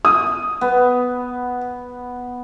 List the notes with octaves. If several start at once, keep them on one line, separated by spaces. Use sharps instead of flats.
D#6
B3